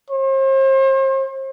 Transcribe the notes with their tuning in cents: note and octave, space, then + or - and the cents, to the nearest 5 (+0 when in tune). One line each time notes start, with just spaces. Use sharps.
C5 +40